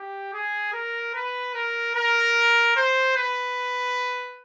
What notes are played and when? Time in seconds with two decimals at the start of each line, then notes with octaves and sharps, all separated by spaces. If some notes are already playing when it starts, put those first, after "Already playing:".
Already playing: G4
0.33 G#4
0.73 A#4
1.14 B4
1.55 A#4
1.95 A#4
2.76 C5
3.16 B4